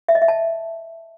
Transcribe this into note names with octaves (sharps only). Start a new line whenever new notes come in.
E5
D#5
E5
A5